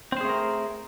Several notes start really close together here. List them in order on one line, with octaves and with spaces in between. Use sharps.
C4 C5 G#4 A3 A#4